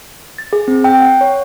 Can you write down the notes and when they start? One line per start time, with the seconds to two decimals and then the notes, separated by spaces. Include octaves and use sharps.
0.38 A6
0.53 G#4
0.68 C4
0.84 G5
1.00 F#5
1.21 C#5